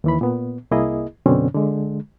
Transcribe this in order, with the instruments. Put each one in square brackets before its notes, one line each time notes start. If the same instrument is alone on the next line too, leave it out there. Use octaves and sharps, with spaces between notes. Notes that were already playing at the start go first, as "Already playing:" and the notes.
[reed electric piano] D#2 E3 B5
A#2 B3
C2 A#3 E4 G#4 D#5
F#2 B2 D3 C4 C#4
D3 G#3